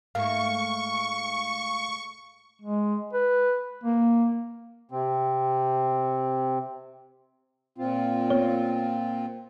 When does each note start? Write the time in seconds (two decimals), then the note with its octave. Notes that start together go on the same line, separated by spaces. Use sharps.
0.15 G#2 A3 A#3 F5 C#6
2.62 G#3
3.13 B4
3.84 A#3
4.91 C3 C4
7.78 A#2 C4 F4
8.30 B3 C#5